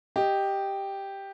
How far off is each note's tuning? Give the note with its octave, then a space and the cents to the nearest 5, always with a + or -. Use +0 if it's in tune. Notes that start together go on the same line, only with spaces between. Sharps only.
G4 +0 D#5 +0